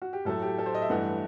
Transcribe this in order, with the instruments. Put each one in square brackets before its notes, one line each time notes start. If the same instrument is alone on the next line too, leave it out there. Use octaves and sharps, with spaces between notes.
[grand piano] F#4
G4
A2 F#3 A3 A4
G4
A4
C5
D#5
E5
G2 E3 A3 F#5